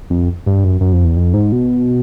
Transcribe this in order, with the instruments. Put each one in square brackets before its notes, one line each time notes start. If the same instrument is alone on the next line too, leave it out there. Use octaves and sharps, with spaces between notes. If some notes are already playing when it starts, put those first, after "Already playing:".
[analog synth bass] F2
G2
F#2
F#2
F2
E2
F2
G#2
B2